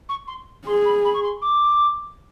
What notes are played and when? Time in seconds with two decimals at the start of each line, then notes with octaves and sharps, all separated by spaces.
0.09 C#6
0.28 C6
0.66 G#4 C6
0.85 B5
1.05 B5
1.14 C#6
1.23 C6
1.42 D6